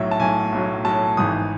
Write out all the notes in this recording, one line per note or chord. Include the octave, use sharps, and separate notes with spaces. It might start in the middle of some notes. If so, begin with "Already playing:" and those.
Already playing: B1 A2 F#3 E5
A5
B1 A2 F#3 G#5
B1 A2 F#3
B1 A2 F#3 A5
G#1 G#2 E3 D#6